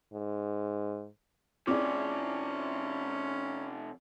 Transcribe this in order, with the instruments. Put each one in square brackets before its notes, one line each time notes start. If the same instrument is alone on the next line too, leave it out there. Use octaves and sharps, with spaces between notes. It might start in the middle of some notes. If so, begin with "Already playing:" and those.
[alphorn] G#2
[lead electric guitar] C3 F3 [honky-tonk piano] C4 E4 G#4 [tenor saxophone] C#4 [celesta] D5 D6